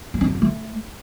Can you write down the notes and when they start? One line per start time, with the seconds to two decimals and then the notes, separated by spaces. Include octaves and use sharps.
0.14 A#3
0.21 C#4
0.28 D#4
0.35 B3
0.42 A3